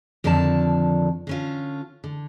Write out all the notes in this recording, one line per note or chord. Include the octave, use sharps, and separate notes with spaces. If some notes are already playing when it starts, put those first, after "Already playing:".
F2 D3 D#3 F3 D5 A5
D3 C#4 F4
D3